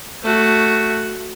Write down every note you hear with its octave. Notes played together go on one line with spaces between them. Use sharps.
A3 F#4